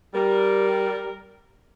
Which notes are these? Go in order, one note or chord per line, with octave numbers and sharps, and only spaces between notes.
G3 A#4